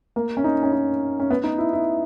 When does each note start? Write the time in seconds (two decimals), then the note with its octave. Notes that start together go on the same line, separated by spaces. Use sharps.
0.16 A#3
0.37 C#4
0.44 D#4
0.63 C#4
0.73 D#4
1.20 C#4
1.31 B3
1.44 D#4
1.58 E4
1.73 E4